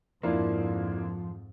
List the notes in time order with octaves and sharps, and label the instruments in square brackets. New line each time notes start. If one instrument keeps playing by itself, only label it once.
[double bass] F2 G#2 [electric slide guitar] F3 [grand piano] A#3 D4 E4